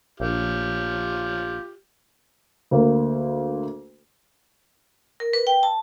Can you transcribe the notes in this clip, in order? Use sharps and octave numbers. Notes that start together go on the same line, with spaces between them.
A#1 F4 G4
D2 A#3
A#4
B4
G5
A5